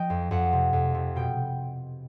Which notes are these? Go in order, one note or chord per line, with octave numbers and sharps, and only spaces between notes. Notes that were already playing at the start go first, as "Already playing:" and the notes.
Already playing: F3 D#5 G5
F2
F2 F#5
C3
F2
C3
B2 G5